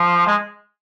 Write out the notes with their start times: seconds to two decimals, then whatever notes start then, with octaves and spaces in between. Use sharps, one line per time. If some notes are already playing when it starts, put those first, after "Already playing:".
Already playing: F3
0.27 G#3